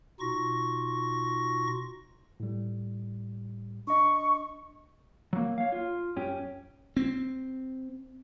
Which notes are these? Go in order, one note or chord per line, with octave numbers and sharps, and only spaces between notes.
B2 D#4 F4 C#6 A#6
A2 G3
D4 D#5 C#6
F#3 A#3
C#5 F5
F4
F#2 C#4 G4
C4